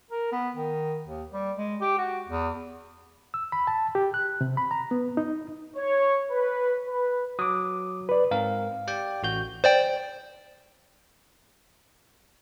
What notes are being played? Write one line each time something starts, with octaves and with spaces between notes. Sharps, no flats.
A#4
B3
D#3
D#2
G3
G#3
G4
F#4
E2
E6
B5
A5
G4
F#6
C3
B5
A#5
B3
D#4
C#5
B4
B4
F#3 D6 D#6
B4 D5
G#2 C4 A#4 F5
G4 D5 G5
A1 F#4 G6
C5 D5 G5